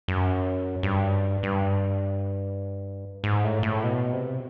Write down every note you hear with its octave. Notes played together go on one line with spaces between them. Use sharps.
F#2
G2
G2
G#2
A2
A2
B2
C3